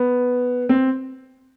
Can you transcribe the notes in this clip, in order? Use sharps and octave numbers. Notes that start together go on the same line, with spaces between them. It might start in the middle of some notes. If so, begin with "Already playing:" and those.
Already playing: B3
C4